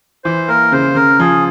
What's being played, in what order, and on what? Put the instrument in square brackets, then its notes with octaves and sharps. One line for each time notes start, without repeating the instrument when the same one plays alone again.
[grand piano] E3 [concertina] C5
[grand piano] A#3 [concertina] A#4
[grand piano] C#3 [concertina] C5
[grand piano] C#3 [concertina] A#4
[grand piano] F3 [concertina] G#4